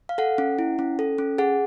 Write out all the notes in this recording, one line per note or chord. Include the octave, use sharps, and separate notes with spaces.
F5
A4 F#5
C#4
E4
C#4
A4
C#4
G#4 F#5